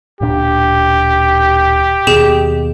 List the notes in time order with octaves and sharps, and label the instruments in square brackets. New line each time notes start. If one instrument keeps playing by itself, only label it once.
[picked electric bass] D1 A#2 D4 [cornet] G4
[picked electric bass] D#2 B2 [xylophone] G#4 E7